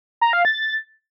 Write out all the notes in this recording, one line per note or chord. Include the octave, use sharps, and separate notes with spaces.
A#5
F5
A6